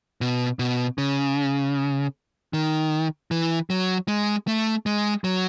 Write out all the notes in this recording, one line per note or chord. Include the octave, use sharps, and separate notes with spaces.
B2
B2
C#3
D#3
E3
F#3
G#3
A3
G#3
F#3